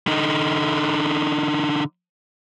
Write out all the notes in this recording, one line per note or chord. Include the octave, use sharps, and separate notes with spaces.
D3 D#4